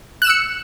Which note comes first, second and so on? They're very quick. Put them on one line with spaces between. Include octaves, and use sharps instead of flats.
F#6 E7 E6 C#7